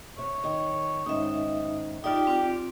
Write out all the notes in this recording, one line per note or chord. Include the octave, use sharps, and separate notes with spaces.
C3 C#5
D#3
G#2 D#3 C#4 D#4 E5
D#4 F4 G4 D5 E5
C4 F4